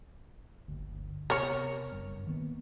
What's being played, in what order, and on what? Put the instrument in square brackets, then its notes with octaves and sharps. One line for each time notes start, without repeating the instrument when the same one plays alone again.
[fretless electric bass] G1 D2
[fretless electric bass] C3 B3 [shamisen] A#4 C#5
[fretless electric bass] F#1 G2
D#3 A#3 B3